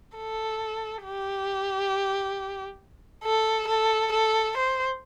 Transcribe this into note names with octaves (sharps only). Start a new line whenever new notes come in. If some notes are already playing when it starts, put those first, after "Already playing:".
A4
G4
A4
A4
A4
C5